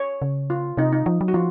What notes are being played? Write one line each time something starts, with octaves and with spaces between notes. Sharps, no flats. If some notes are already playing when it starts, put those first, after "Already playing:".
Already playing: C#5
C#3
F4
C3 D#4
D#4
F3
F#3
F#4
F3 F4